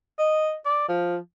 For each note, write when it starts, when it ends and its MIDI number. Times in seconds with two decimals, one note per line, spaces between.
0.19 0.55 75
0.65 0.88 74
0.89 1.17 53